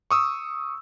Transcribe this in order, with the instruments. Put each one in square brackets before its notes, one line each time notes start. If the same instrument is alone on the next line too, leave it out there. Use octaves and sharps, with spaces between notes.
[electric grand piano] C#6 D#6 E6